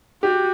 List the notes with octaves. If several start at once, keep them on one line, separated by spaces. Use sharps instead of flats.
F#4 G4